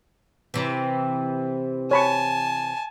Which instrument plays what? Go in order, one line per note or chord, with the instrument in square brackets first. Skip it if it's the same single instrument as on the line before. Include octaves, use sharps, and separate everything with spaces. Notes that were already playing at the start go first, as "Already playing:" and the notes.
[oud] C3 E3
[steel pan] C#5 B5 C#6 [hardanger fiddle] G#5 A5